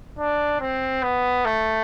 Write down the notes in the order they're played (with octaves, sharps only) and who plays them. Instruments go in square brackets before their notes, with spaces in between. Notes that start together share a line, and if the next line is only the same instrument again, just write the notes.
[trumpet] D4
C4
B3
A3